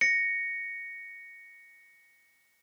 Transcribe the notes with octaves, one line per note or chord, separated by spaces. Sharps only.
A#6 C#7